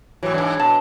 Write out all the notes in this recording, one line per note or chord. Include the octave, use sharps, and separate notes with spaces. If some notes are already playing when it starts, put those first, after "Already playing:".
A2 E3 F#3
G#2 E3 D4
B2 A5